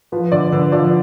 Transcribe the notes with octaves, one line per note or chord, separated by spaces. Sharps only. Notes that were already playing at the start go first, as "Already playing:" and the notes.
F3 B4
D3 D5
D3 B4
F3 D5